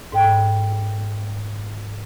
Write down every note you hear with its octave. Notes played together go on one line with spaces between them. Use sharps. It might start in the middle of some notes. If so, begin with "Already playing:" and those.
G#2 A4 G5